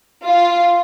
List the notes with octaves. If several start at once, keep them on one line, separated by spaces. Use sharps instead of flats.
F4